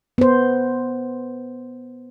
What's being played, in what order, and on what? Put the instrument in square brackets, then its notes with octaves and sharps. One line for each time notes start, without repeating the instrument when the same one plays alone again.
[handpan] B3 C5